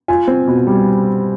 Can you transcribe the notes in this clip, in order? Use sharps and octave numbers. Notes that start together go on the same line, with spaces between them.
F4 G#5
C4
B2
G3